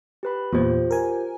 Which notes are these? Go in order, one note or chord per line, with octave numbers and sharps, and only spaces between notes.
G4 B4 B5
E2 A#2 F4 G4 C5
A#4 G#5